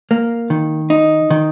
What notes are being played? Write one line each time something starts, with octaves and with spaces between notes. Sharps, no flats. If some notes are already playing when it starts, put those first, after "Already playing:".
A#3
D#3
D#4
D#3